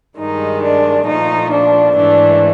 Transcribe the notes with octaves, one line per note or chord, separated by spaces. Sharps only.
G2 D#3 G#3 D#4
D4
A#2 F3 A3 D#4
D4
G#2 E3 A3 D4